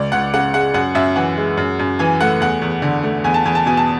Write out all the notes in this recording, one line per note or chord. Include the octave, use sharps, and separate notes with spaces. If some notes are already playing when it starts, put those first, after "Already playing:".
Already playing: C#2 D5
C#2 F#5
C#3 F#5
G#3 F#5
F#2 F#5
F#2 E5
E3 F#5
G#3
F#2
F#2
E3 G#5
A3 F#5
E2 F#5
E2
D3
A3
E2 G#5
A5
E2 G#5
A5
B2 G#5
A5